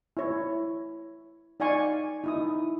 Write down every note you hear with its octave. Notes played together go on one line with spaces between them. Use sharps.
E4 C#5
D#4 D5 F5 G#5 C#6
D#4 E4 D#6